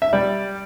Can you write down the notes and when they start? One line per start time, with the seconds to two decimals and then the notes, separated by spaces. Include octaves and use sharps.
0.02 E5
0.13 G3 D5